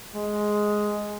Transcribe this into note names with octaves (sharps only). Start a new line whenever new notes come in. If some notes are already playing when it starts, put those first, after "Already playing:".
G#3